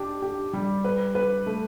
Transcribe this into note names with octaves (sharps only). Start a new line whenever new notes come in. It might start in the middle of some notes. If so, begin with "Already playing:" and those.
Already playing: D4 G4
G4
G3
B4
B4
A3